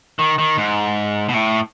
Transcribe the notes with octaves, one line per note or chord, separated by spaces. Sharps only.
D#3
D#3
G#2
B2
A2